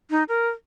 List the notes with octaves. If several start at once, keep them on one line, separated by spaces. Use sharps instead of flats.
D#4
A#4